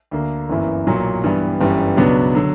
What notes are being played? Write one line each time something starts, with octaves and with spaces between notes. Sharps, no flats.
D2 D3 A#3
G1 F#2 E3 A#3 E4
B1 A#2 F#3
G2 E3 G3 B3
G1 F#2 E3 G3
C#2 B2 F#3 B3 D4
D3 F#3